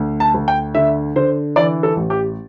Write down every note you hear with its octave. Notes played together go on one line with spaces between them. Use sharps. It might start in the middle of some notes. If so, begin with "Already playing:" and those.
Already playing: D2
A5
D2
G5
D3 E5
D3 C5
E3 D5
A4
A1
G4